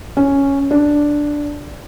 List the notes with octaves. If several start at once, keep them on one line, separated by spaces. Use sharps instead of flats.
C#4
D4